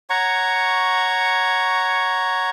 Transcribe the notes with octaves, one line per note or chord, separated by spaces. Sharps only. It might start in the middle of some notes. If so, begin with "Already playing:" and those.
C#5 F#5 A#5 C#6